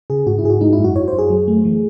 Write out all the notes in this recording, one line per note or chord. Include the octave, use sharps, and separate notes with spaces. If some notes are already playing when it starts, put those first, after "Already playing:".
C#3 G#4
G#2 F#4
E4
G#2 G#4
F#4
G#3 D#4
E4
F#2
F#4
F#2 C#5
C5
F#2
G#4
F#3
A3
E3